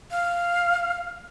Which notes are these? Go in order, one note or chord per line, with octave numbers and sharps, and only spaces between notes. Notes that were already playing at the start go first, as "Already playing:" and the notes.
F5